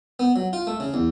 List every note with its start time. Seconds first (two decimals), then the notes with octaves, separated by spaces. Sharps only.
0.20 B3
0.36 F#3
0.53 F4
0.67 A3
0.80 C#3
0.94 E2